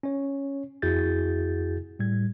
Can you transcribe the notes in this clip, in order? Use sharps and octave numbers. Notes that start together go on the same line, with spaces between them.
C#4 C#5
F2 E4 F#4 G#4 G6 A6
A2 G3 G#6